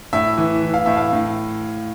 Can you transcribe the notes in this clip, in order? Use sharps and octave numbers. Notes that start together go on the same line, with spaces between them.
A2 E5
E3
E3
F5
A2 E5
F5
A2